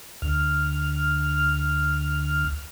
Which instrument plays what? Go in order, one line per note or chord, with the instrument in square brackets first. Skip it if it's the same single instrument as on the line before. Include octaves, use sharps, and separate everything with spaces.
[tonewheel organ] D2 F6